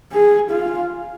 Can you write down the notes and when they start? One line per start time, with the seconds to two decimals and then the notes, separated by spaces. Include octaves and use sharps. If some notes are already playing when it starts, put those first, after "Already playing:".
0.12 G#4
0.51 F4